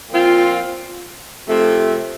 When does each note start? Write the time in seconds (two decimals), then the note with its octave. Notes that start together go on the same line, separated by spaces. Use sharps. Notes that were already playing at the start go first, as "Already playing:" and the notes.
0.10 A#2 F3 C4 F4
1.48 C3 F3 A3